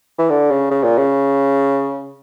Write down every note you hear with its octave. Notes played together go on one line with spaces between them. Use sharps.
E3
D3
C#3
C#3
A#2
C#3